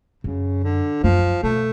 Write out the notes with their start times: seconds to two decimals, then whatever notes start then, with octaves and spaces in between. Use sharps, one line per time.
0.24 F#2 C#3
0.64 D3
1.03 F#2 F3
1.43 B2 A3